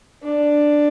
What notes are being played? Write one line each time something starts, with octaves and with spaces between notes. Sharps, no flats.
D4